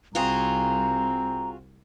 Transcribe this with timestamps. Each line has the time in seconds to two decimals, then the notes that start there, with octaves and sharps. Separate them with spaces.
0.15 C2 C4 F4 F#4 G#4 A#5